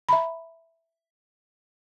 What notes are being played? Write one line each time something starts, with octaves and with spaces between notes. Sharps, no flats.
E5 A#5 B5